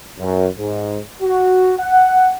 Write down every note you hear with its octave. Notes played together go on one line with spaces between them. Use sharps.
F#2
G#2
F#4
F#5